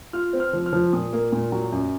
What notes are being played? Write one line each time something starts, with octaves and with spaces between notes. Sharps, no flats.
F4 F6
C4
F6
F3
F6
F3
A#2 D#6
A#3
A#2
F#3
F#2